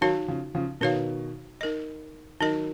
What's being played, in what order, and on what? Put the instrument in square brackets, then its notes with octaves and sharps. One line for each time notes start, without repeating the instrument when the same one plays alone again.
[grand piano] D#3 F#3 [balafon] D#4 F#4 C#5 F5
[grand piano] C#3 F3
C#3 F3
[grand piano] B2 D#3 [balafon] D#4 F#4 C#5 F5
[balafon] D#4 A#4 D#5
[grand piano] D#3 F#3 [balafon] D#4 A#4 D#5